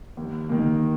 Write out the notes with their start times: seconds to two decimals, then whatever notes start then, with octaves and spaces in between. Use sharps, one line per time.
0.17 D#2
0.49 D#3 A#3